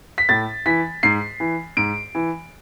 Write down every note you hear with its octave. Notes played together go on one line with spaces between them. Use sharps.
B6
A2 A6
E3 B6
G#2 C7
E3
G#2 D7
E3